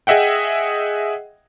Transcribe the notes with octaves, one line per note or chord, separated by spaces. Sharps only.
G#4 D#5 E5 F#5 G5